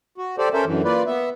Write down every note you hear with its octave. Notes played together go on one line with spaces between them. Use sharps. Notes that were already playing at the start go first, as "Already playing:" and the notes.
F#4
G4 A4 C5 D5
C#4 A4 A#4 C5 E5
F#2 D3 E3
A#3 F4 B4 D5
B3 E5